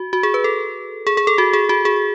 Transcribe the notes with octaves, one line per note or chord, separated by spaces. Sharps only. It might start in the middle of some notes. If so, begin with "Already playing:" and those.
Already playing: F#4
F#4
G#4
B4
A4
G#4
G#4
A4
F#4
G#4
F#4
G#4